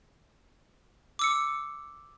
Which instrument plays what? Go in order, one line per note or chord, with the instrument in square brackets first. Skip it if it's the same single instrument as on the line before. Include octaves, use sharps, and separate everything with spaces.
[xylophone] D6 E6 C#7